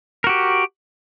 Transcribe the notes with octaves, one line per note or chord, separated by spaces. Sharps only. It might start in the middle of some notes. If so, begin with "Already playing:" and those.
F#4 G4 A#4